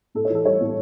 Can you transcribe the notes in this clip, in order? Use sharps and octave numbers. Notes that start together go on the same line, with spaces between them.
A2 A4
C#5
E3
A4
G3 C#5
A2